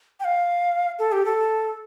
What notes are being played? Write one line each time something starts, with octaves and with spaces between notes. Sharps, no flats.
G5
F5
A4
G4
A4